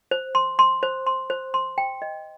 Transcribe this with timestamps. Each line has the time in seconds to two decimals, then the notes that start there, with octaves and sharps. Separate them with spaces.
0.11 C5
0.35 C6
0.59 C6
0.83 C5
1.06 C6
1.30 C5
1.54 C6
1.78 G5
2.02 D#5